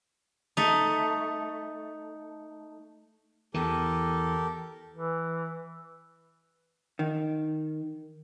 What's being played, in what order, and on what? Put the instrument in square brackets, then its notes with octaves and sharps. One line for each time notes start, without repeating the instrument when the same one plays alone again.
[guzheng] A3 D#4
[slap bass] E2 E3 [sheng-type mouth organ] G4 A4 A#4
[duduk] E3
[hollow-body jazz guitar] D#3